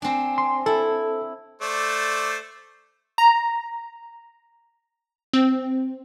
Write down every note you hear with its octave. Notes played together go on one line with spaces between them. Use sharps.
C4 D4 G#5
C6
E4 A4
A3 C5 D5
A#5
C4